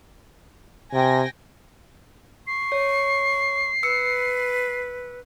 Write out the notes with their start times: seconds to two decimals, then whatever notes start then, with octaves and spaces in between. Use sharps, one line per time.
0.93 C3 G5 G#5 A#6
2.47 C#6 C7
2.72 C#5
3.83 B4 E6 C#7